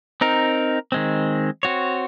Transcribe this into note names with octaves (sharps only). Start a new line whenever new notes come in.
C4 D#4 A#4
D#3 G#3 C4
C4 F#4 C#5